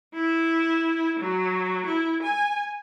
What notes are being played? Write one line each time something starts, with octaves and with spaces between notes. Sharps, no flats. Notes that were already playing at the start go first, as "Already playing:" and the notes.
E4
F#3
E4
G#5